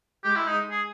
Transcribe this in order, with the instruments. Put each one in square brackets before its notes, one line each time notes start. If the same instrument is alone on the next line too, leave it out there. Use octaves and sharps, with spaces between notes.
[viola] G#3 [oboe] G4
[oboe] E4
D#4
G#4